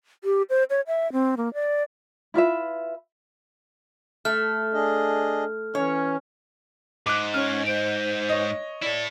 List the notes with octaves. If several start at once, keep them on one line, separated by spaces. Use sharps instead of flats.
G4
C5
C#5
E5
C4
A#3
D5
E4 F4 B4 E5
A3 F6
D4 G#4 D#5
E3 C#4 C#5
G#2 D6 F#6
C#4 F6
C5 D7
C#5 D#5
E4 A4 D5